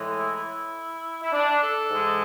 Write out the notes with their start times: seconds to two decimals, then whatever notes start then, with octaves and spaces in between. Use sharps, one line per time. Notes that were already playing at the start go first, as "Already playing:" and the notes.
Already playing: A2 E3 G#3
0.16 E4
1.22 E4
1.33 D4
1.62 A4
1.91 G#2 E3 G#3